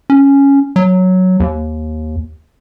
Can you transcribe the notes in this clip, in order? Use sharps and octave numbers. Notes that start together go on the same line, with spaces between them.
C#4
F#3
D#2